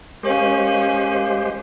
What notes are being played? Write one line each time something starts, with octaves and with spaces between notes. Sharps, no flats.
G#3 C#4 G4 A#4 C5 F5